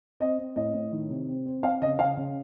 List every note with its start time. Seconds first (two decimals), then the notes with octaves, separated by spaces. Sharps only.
0.20 C4 D#5
0.38 C4
0.56 A2 D#5
0.74 A2
0.92 D#3
1.10 C3
1.28 C4
1.46 C4
1.63 C4 F5
1.82 C#3 D#5
1.99 C#3 F5
2.17 C#3